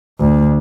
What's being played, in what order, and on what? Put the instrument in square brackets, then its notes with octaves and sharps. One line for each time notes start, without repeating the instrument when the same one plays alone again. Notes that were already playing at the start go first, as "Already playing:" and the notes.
[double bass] D2